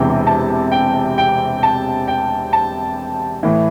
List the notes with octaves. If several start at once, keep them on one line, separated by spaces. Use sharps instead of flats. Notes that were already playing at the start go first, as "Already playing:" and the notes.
Already playing: E1 E2 C3 E3 G5
A5
G5
G5
A5
G5
A5
A2 E3